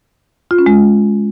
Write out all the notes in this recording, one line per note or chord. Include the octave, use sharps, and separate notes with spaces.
F4
C#4
G#3